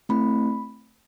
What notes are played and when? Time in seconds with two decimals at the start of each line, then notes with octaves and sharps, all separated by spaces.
0.09 A3 C4 E4 B5